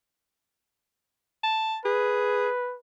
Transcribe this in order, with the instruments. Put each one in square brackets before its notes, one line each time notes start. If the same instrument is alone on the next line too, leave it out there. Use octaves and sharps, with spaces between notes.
[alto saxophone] A5
[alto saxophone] G#4 [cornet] B4